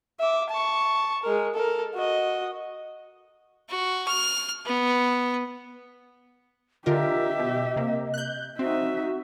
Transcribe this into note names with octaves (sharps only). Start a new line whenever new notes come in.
E5 D6
A5 C#6
G#3 A#4
A4 A#4
F#4 D#5
F#4
F6
B3
D3 F4 G4 A#4 D#5 E5
B2
C3 A#3
F#6 G6
C4 D#4 F#4 E5